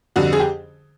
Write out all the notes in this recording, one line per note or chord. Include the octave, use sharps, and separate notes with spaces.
F2 D3 G3 F#4
G#4
G4